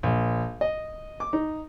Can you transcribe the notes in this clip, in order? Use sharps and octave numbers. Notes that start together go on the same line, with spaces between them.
A#1
D#5
D6
D#4